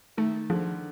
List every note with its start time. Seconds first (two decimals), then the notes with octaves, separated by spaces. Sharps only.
0.17 D#3 A3
0.50 D3 F3